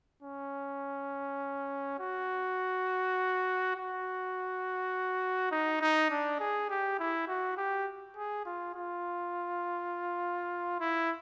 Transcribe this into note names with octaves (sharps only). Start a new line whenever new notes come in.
C#4
F#4
F#4
D#4
D#4
D4
G#4
G4
E4
F#4
G4
G#4
F4
F4
E4